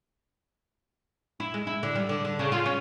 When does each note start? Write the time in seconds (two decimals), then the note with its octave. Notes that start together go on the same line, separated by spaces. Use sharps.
1.40 E4
1.54 G#3
1.67 E4
1.83 D3
1.96 G3
2.09 D3
2.25 D3
2.39 C#3
2.52 F4
2.66 C#4